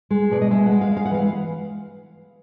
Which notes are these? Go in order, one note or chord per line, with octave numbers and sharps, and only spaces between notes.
G#3
B2 D5
D#5
G#3 E5
F#5
G#3
F5
G#3
F5
F#5
E3 F5